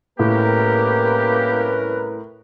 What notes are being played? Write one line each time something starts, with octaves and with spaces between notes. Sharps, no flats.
C2 A2 A#3 C#4 G4 A#4 B4